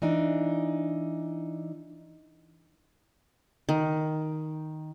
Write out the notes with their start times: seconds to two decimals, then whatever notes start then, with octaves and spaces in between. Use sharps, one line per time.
0.02 E3 D4 D#4
3.69 D#3